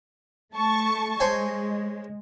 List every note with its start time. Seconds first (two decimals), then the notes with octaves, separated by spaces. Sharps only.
0.54 A3 A5 C#6
1.20 G#3 C5 C#5 G#5